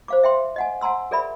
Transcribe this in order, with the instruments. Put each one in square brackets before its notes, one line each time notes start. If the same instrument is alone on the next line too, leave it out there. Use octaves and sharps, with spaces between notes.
[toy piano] C5 F5 D6
E5 G5 C6
D#5 F#5 G#5
F#5 G#5 A#5 C6 E6
G#4 A#4 D5 E5 B5